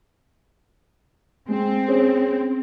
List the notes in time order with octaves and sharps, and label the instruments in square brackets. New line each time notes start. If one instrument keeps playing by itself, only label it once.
[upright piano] G#3 [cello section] C4
[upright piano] C#4 G#4 C5